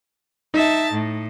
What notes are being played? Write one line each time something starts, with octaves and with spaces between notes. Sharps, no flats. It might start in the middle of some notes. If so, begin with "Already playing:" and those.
D#4 E5 A5
A2